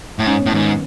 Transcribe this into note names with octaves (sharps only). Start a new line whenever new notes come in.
A2
G#2 C#4
B3
A2
G#2 D#3